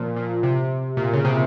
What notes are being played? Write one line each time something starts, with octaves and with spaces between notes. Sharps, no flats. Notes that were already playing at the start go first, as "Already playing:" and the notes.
Already playing: A#2 F3
A#2
C3
A#2
C#3
C3